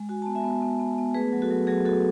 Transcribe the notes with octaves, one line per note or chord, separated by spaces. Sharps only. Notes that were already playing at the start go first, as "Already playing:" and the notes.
Already playing: G#3
F#4 G#5
B3 A5
E5 G#5
B3
B3
B3
B3
A3 G#4 B4
F#3
F#4 A4
F#3
F#3 G#4
F#4 A4